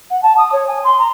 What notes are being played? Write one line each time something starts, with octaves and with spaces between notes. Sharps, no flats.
F#5
A5
D#6
C#5
G#5
C6
A#5